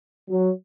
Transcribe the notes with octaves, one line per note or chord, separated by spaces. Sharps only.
F#3